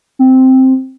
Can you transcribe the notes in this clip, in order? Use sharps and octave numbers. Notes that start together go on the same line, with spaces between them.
C4